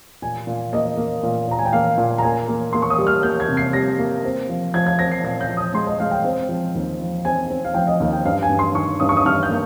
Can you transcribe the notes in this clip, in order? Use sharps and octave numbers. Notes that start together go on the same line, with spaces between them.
A#2 G#5
A#2
A#3 D#5
A#3
A#2
A#2 A#5
G#5
G5
A#3 F5
A#2
A#5
A#3 G#5
A#3
A#3 C6
C#6
D#6
G3
F6
A#3 G6
G#6
C3
C7
G3 A#6
A#3
C4
F3
F3 G#6
G#6
C4 A#6
C7
A#2 A#6
G6
F3
D#6
G#3 C6
D#5
G#3 F5
G5
C4
F3
D#2
F3
C4 G#5
C4
F5
F3 G5
D#5
D#2 F5
G5
G2 F5
G#5
G2
C6
D#3 C#6
G2 D#6
C#6
D#6
G2 F6
G6
A#3